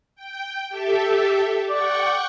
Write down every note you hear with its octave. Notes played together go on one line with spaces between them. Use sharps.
G5
G4 A4 E5
D5 F#5 G5 C#6